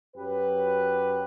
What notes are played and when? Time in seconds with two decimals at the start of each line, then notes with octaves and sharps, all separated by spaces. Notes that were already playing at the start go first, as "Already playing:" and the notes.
0.16 F#2 F#3 G4 B4